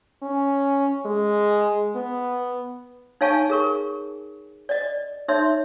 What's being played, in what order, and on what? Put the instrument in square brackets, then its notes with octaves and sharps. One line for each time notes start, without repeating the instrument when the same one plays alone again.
[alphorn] C#4
G#3
B3
[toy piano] D#4 C#5 F5 G#5 A5 C#6
G#4 A#4 C#6
D5 D#5
D#4 C#5 E5 C6